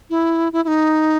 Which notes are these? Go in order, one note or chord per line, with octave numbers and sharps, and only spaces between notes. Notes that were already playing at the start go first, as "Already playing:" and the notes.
E4
E4
E4
D#4